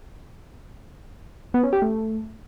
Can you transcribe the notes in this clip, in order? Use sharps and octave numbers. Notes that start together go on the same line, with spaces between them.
B3
C#4
G4
A3